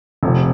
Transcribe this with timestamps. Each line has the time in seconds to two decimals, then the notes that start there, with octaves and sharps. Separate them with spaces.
0.23 F1 F2 C3